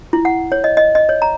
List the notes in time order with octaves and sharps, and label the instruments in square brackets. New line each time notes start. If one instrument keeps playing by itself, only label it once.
[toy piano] E4
F#5
C#5
D#5
D#5
D#5
C#5
A#5